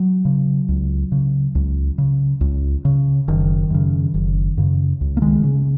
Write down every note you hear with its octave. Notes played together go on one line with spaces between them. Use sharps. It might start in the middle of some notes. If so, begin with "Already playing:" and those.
Already playing: F#3
C#3
C#2
C#3
C#2
C#3
C#2
C#3
F#1 D#3
F#2 C#3
F#1
F#2 C#3
C#2
A#3
D#3 G#3
C#3